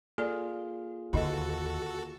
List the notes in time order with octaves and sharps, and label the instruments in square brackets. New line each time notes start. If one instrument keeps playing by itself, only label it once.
[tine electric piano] A#3 F4 G#4 [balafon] A4 D5
[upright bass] D#2 [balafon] D3 D#4 D#5 [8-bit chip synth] F#4 A4